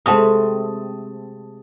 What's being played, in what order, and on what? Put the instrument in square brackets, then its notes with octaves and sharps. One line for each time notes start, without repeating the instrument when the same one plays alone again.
[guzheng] C3 A3 C4 [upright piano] G#3 A5 D#6